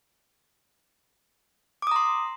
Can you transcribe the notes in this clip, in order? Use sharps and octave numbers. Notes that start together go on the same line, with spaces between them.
A#5 C6 D6 D#6